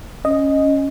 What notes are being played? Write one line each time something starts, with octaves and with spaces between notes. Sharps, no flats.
C#4 D#5